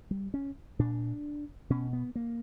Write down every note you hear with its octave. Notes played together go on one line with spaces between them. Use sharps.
G3
C#4
A#2 D4
B2 C#4
B3
A#3